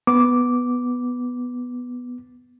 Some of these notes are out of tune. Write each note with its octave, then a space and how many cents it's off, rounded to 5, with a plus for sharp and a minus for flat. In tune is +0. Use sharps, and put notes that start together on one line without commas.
B3 +0 D6 -5